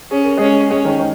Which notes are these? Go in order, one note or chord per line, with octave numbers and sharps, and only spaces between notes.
C#4 G#4
A#4
G#3 C#4 G#4
G#3 C#4 G#4
D#3 D#4
D#3